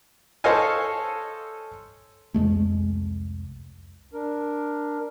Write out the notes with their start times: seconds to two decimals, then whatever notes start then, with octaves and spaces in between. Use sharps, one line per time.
0.44 A4 C5 C#5 D#5 F5 G#5
2.34 C2 F2 G#3 A3
4.13 D4 A#4